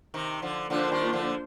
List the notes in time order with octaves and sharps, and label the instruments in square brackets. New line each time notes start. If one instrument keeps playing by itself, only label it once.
[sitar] C3 D#3
D3 F3
[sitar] D3 F3 [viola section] A#3 D4 F4 C5
[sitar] D#3 G3
D3 F3